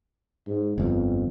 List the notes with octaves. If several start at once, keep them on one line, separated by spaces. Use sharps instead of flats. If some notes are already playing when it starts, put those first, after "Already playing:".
G#2
G1 F2 B3